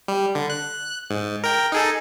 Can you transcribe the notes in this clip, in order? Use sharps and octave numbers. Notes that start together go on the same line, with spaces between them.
G3
D3
F#6
G#2
A#4 G5
D#4 G#4 A4